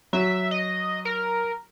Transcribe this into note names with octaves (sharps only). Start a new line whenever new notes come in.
F#3 E5
D#5
A#4